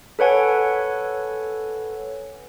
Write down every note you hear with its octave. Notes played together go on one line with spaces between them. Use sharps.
A4 B4 C#5 F#5 G#5